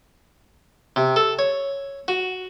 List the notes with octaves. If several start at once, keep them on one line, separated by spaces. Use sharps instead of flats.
C3
A4
C#5
F#4